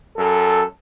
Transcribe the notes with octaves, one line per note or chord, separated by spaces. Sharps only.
F#2 A4